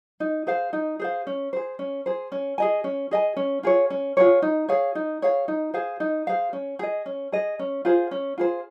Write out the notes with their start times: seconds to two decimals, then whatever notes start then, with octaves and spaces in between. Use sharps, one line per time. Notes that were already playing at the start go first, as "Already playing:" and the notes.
0.20 D#4
0.47 G#4 C5 F5
0.73 D#4
0.99 G#4 C5 F5
1.27 C#4
1.53 G#4 C5
1.79 C#4
2.06 G#4 C5
2.32 C#4
2.58 G#4 D#5 G#5
2.84 C#4
3.11 G#4 D#5 G#5
3.36 C#4
3.63 F4 G#4 C#5
3.90 C#4
4.17 F4 G#4 C#5
4.42 D#4
4.69 G#4 C#5 F5
4.95 D#4
5.22 G#4 C#5 F5
5.48 D#4
5.74 G#4 C5 F5
6.00 D#4
6.27 G#4 C5 F5
6.53 C#4
6.79 G#4 D#5
7.06 C#4
7.32 G#4 D#5
7.59 C#4
7.85 F4 G#4 C5
8.11 C#4
8.38 F4 G#4 C5